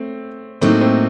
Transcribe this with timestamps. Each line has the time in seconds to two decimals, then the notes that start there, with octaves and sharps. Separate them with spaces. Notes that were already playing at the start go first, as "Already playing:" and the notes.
Already playing: A3 C4
0.61 A2 F#3 A3 A#3 C4 D#4
0.81 A3 C4